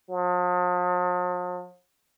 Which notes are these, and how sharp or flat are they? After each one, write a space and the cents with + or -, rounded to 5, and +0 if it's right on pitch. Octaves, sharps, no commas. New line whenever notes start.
F3 +45